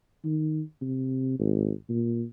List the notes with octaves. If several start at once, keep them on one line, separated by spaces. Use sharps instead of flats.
D#3
C3
G#1
A#2